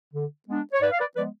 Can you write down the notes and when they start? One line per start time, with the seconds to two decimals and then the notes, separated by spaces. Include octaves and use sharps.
0.12 D3
0.47 G#3 B3 D4
0.73 C#5
0.81 G#2 B4 D5
0.91 F5
0.99 B4 D5
1.16 F3 G#3 B3 B4 D5